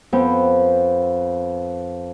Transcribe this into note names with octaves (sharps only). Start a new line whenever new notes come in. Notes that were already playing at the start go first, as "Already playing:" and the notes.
F2 B3 G5